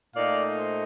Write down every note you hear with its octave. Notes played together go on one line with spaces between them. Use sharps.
A#2 A3 D#4 D5 F5
C5